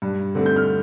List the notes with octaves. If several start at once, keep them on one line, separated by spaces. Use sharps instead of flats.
G2
D3 A3 C4
G6
F6